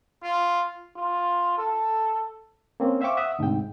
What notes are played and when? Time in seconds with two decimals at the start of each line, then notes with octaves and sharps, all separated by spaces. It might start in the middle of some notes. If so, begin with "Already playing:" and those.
0.23 F4
0.96 F4
1.58 A4
2.80 A#3 C4 C#4
3.01 C5 E5 F5 G5 C#6 D6
3.17 E5 F#5 D#6
3.39 D2 G#2 C3 G5